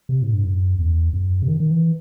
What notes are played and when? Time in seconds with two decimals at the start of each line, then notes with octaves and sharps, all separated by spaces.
0.09 C3
0.22 A2
0.33 G2
0.44 F#2
0.78 E2
1.13 F#2
1.42 C3
1.48 D#3
1.60 D#3
1.71 E3